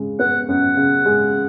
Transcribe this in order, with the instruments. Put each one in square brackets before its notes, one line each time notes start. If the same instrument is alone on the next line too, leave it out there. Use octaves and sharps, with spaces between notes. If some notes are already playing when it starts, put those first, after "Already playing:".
Already playing: [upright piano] C#3 G#3
[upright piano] B3 [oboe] F#5
[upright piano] F#2 [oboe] F#5
[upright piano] C#3
G#3